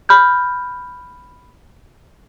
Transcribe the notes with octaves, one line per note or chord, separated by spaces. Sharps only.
B5 F6 G6